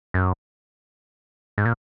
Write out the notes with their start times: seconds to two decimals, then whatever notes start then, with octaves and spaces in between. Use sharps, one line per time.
0.14 F#2
1.58 G#2
1.65 A#2